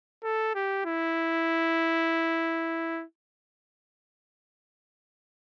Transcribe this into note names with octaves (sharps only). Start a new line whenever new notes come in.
A4
G4
E4